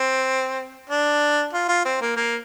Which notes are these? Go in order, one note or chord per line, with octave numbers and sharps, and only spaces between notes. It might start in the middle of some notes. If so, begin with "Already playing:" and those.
Already playing: C4
D4
F4
F4
C4
A#3
A#3